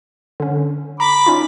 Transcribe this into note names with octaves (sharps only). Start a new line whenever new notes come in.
D3 C#4
A#5 B5 D6
C#4 D#4 F4